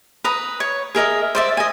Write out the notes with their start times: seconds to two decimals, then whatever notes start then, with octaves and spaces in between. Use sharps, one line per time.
0.24 B4 A#5 D#6
0.60 C#5
0.95 G#4 A#4 D#5 E5
1.35 C5 D5 E5
1.57 D#5 G#5